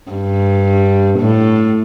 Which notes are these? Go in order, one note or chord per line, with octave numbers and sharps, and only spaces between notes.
G2
A2